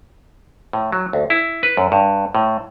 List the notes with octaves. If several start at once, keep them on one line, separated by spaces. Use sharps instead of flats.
A2
F#3
D2
E4
B4
F#2
G2
A2